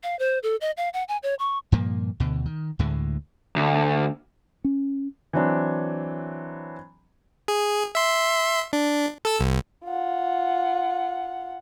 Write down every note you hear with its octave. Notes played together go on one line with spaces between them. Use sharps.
F5
C5
A4
D#5
F5
F#5
G#5
C#5
C#6
G2 A#2 F3 A#3
D2 B2 D3
D#3
D2 A2 D3 G#3
D2
C#4
E3 F#3 C4 D4
G#4
E5 C6
D4
A4 E6
C2
F4 F#5